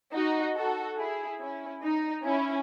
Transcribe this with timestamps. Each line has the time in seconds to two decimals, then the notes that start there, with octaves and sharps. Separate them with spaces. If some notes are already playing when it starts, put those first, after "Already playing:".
0.13 D#4 F#4
0.55 F#4 A4
0.97 E4 G#4
1.40 C#4 E4
1.82 D#4
2.25 C#4 E4